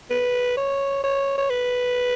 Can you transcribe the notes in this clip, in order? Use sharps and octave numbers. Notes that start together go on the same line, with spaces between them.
B4
C#5
C#5
C#5
B4